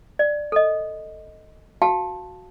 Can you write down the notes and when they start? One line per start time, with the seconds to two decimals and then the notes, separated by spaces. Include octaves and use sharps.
0.19 D5
0.52 A4 D#5
1.82 F#4 F5 G5 A5